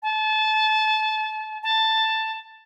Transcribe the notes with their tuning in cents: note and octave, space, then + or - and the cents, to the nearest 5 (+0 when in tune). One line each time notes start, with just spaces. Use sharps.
A5 -25
A5 +10